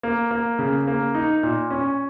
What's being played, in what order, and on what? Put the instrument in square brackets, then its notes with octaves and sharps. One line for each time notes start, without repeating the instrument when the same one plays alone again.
[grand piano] A#3
A#3
C#3
A#3
D#4
A#2
C#4